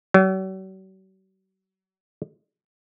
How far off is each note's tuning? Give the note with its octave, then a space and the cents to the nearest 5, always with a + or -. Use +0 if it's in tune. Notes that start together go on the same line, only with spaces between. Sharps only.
F#3 +45